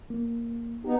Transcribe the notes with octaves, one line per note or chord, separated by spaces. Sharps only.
A#3
B3 D#4 G4